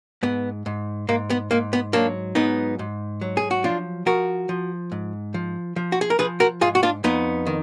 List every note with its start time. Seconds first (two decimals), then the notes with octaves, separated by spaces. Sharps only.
0.23 G#2 B3
0.66 G#2
1.09 G#2 A#3
1.30 B3
1.51 G#2 A#3
1.73 B3
1.93 F#3 A#3 D4
2.35 G#2 B3 D#4
2.79 G#2
3.21 F#3
3.37 G#4
3.51 F#4
3.64 F3 D4 F4
4.06 F3 F#4 A#4
4.49 F3
4.92 G#2
5.34 F3
5.76 F3
5.92 F#4
6.01 G#4
6.10 A#4
6.19 F3 G#4 B4
6.40 F#4 A#4
6.61 G#2 F4 G#4
6.75 F#4
6.83 D4 F4
7.04 F2 B3 D#4
7.47 D#3